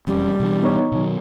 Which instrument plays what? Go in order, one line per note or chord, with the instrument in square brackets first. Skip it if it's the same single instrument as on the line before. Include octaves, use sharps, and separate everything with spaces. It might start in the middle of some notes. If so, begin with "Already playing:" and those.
[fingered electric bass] E1 F2 C#4 [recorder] G3
[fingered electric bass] B2 E3 D4
[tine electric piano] B3 D#4 C#5
[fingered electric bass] B2 D#3 F#3